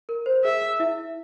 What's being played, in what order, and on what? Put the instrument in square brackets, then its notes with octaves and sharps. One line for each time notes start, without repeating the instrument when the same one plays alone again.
[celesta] A#4
C5
[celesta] G#4 [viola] E5
[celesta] E4 E5